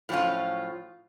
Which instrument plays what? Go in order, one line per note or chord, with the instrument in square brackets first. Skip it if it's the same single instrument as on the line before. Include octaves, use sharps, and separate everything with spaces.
[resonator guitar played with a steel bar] A2 F3 F#3 B3 C#4 F4